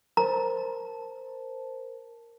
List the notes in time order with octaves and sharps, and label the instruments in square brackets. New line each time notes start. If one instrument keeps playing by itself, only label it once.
[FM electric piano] A#4 C5 A5 [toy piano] A#5